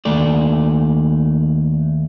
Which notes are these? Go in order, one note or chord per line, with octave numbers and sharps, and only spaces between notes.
D#2 A3 D5